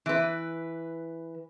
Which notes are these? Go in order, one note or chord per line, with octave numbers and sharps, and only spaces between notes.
E3 B4